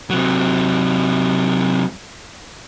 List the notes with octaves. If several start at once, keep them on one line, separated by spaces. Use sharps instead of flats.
C3 F#3